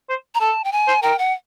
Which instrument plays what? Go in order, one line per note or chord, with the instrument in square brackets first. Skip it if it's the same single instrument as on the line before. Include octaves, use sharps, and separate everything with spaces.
[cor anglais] C5
[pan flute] A#5
[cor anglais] A4 [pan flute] A5
[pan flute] G5
G#5
[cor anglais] C5
[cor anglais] A#4 [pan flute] G5
[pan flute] F#5